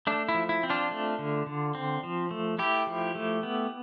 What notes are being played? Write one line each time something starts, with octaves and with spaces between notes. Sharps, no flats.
A3 D4
E4
F3
E4
C4
D4 F4
A3
D3
D3
C4
F3
A3
A3 E4 G4
F3
A3
B3